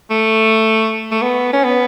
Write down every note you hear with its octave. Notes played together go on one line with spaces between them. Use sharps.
A3
A3
B3
C#4
B3